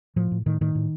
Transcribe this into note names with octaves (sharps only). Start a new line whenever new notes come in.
A2 F3
A2
A2 D#3
A2 D#3
A2